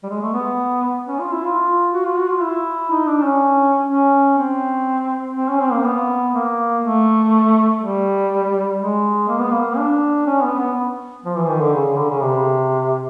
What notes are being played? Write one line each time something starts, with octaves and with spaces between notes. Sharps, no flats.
G3
G#3
A3
B3
C#4
F4
E4
F4
F#4
F4
F#4
F4
E4
D#4
D4
C#4
C#4
C4
C4
C#4
C4
A#3
B3
A#3
A3
G3
G#3
A#3
B3
A#3
D4
C#4
B3
B3
F3
E3
D#3
D3
C#3
D3
C#3
C3